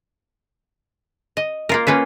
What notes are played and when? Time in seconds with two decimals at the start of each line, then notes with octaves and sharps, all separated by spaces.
1.37 D#5
1.69 A#3 F4 A#4
1.87 A#3 C#4 F4 B4